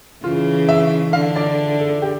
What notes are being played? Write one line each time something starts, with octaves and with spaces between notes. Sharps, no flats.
C#3 E3 F4
E5
D3 F5
D5
A4
G4